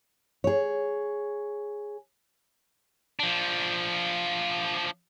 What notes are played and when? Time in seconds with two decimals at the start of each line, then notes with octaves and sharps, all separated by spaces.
0.44 G#4 C#5
3.20 F3 D4